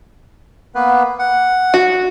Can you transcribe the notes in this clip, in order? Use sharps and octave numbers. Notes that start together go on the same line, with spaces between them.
A#3 B3 B4
F#5
F#4